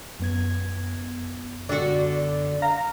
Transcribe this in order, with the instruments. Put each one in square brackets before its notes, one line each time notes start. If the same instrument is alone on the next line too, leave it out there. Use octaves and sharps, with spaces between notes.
[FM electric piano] F#2 B3 G#6
[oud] D3 F#4 [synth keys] D5
[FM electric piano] F5 [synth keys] A#5